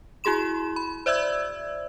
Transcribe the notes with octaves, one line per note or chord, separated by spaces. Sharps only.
E4 F#4 G#4 C6 E7
B5
C5 D5 E5 E6 G#6